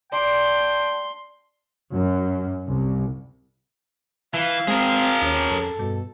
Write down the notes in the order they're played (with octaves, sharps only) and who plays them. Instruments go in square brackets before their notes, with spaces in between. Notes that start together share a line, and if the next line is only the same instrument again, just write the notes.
[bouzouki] D4 [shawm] G5 [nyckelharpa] C6
[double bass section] F#2
C2
[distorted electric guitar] E3 [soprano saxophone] F5
[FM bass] G#3 [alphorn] C4 [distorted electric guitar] G#4 A#4
[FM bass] D#2 [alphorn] C#4
[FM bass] F2 [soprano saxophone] A4
[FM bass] G2 [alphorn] B2